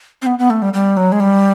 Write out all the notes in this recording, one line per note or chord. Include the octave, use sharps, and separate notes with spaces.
C4
B3
B3
A3
G3
G3
F#3
G#3
G3